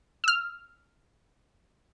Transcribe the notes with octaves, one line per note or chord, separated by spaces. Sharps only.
E6 F6